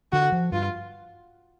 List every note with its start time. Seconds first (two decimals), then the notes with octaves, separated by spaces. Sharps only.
0.12 D3 F#4
0.32 F3
0.52 G2 F4